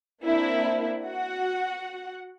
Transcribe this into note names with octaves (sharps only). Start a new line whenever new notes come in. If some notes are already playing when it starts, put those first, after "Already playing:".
A#3 C4 D4 E4
F#4 F#5